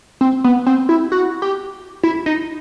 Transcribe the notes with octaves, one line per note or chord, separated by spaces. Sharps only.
C4
B3
C4
E4
F#4
G4
E4
D#4